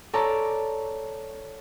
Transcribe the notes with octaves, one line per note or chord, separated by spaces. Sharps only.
A4 C#5 D5 A5 A#5